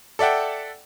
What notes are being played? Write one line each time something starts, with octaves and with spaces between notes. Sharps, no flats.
A4 D5 E5 F#5 G5